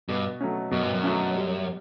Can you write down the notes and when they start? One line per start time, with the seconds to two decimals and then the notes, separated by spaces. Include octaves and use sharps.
0.08 G2 B2
0.41 F#3 A3 C#4
0.71 F#2 B2
0.83 G2
0.94 F#2
1.03 F#3 A3 C#4
1.35 G3